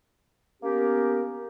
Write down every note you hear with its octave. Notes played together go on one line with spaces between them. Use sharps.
A#3 B3 C#4 G4 A#4